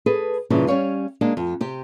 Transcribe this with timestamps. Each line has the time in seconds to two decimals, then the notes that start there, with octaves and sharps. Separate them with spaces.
0.06 G#4 A4 B4
0.50 G2 A#2 C#3 E3 G3
0.67 G3 C#4 C#5 F5
1.21 G#3 A#3 D4
1.37 F2
1.61 C3 G4